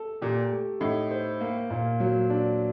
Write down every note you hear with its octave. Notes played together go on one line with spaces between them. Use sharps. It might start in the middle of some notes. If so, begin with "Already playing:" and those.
Already playing: A4
A#2 G4
A3
A2 D#4
C5
A#3
A#2
F#3
D4